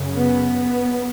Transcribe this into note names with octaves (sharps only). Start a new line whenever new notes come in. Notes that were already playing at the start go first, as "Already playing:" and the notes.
Already playing: F#2 C#3
B3